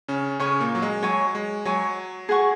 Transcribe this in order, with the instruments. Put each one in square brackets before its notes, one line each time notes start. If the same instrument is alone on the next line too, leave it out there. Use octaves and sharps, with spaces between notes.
[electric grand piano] C#3 C#4
[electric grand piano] C#3 C#4 [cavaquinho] C#5 G#5 C#6
[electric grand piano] A#2 A#3
F#3
G#3
[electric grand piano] F#3 [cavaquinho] C#5 G#5 C#6
[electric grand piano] G#3
[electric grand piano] F#3 [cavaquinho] C#5 G#5 C#6
[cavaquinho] G#4 F#5 C#6